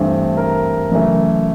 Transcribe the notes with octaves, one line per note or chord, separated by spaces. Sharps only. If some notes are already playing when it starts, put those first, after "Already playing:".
Already playing: G2 E3 A3 C4
A#4
F#2 C#3 E3 A3